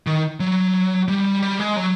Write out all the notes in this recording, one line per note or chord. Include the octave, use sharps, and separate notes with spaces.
D#3
F#3
G3
G3
G#3
F#3